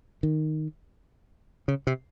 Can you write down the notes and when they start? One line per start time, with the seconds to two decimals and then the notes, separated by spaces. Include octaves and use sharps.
0.23 D#3
1.68 C#3
1.87 C3